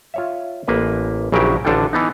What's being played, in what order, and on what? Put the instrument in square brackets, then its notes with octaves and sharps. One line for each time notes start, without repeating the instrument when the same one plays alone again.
[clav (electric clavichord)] F4 C#5 E5
A1 A#3 B4
A#1 C#3 F#3 E4 G4 A#4
A1 D3 D4 F4 A4 G5
E3 B3 D#4